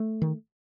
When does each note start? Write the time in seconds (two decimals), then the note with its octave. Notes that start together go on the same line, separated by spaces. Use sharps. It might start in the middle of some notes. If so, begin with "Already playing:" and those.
Already playing: A3
0.22 D#3